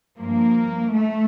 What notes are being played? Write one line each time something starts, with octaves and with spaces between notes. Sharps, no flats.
G2 F3 A#3
A3